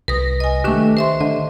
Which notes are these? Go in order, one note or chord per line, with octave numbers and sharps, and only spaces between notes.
C2 B4 D#6 A#6
D#5 G#5
D#3 A3 D4 G4 C#6
C5 E5 C6
D3 D#5